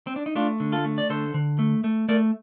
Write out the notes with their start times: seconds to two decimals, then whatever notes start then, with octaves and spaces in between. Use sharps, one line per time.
0.07 C4
0.16 D4
0.26 D#4
0.35 A3 D4 F4
0.60 D3
0.72 F4 A4
0.85 A3
0.98 D5
1.10 D3 A4 C5
1.34 D3
1.59 A3
1.84 A3
2.09 A3 A#4 D5